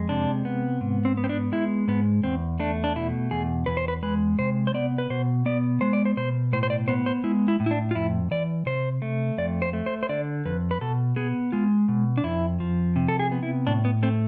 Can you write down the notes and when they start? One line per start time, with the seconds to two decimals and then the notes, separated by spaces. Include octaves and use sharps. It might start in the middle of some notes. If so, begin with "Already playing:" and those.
Already playing: F2 G#3
0.09 C3 D4
0.45 B3
0.81 G#2
1.05 C4
1.17 B3
1.24 C4
1.29 D4
1.52 G#3 E4
1.88 G#2 B3
2.23 E2 C4
2.60 A3 D4
2.84 D4
2.96 B2 E4
3.31 E2 G#4
3.66 E2 B4
3.77 C5
3.88 B4
4.03 G#3 B4
4.39 C3 C5
4.67 C5
4.74 B3 D5
4.98 B4
5.10 B2 C5
5.46 B3 D5
5.81 G#3 C5
5.93 D5
6.05 C5
6.17 B2 C5
6.53 A2 C5
6.63 C5
6.70 D5
6.88 B3 C5
7.06 C5
7.24 G#3 E4
7.48 E4
7.60 A2
7.66 E4
7.71 D4
7.91 F4
7.95 F2 E4
8.31 E3 D5
8.66 C3 C5
9.02 A3
9.38 F2 D5
9.62 C5
9.73 A3
9.86 C5
10.03 C5
10.09 D3 D5
10.45 F2 B4
10.71 B4
10.81 B2 A4
11.16 B3 G#4
11.52 G#3 F4
11.88 B2
12.17 D4
12.24 F2 E4
12.60 F3
12.96 C3
13.08 A4
13.19 G#4
13.32 B3
13.43 E4
13.67 A2 D4
13.85 B3
14.03 A3 C4